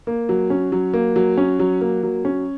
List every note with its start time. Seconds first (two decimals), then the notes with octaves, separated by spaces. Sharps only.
0.07 A#3
0.29 F#3
0.50 C#4
0.72 F#3
0.94 A#3
1.16 F#3
1.37 C#4
1.59 F#3
1.81 A#3
2.03 F#3
2.25 C#4